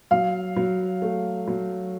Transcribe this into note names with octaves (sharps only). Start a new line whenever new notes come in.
F#3 F5
F#3
A3
F#3